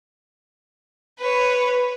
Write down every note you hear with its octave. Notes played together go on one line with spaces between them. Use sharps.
B4 C#5